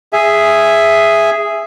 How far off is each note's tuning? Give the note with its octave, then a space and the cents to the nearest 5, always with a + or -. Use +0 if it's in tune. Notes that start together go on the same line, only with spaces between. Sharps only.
G#4 +0 E5 +5 G#5 +0